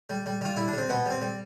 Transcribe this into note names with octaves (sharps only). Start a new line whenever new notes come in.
G3
G3
G3 F4
G3 E4
D4
G3 C4
B2 B3
G3 C4
G3